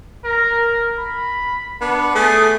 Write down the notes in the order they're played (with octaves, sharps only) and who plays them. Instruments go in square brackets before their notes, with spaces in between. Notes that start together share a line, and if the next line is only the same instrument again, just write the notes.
[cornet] A#4
B5
[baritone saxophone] B3 [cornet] D4
[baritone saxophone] A3 [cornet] G#4